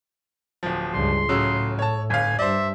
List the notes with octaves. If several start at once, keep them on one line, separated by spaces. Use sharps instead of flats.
D1 F3
C#2 G2 C6
A2 C#3 F#3 E6
C#5 A5
G1 F5 G#5
G2 C5 D5 E5